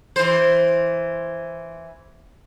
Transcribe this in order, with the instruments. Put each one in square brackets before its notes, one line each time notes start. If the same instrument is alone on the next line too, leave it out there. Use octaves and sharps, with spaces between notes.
[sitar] E3 C5